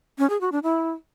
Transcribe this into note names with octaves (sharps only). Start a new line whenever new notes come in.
C#4
G#4
F#4
D4
E4